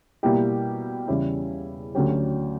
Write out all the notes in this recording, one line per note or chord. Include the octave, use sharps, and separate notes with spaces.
B2 G3 A#3 E4 G4
E2 C#3 G3 C#4 E4
D2 D3 F#3 C#4 G4